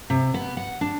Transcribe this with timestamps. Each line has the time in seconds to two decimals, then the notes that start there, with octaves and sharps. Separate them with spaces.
0.10 C3
0.34 B3
0.57 F#5
0.81 D4